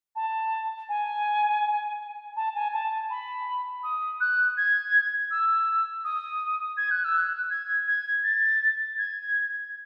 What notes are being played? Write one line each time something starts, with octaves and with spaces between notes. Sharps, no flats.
A5
G#5
A5
G#5
A5
B5
D#6
F#6
G#6
E6
D#6
G#6
F#6
E6
F#6
G#6
G#6
A6
G#6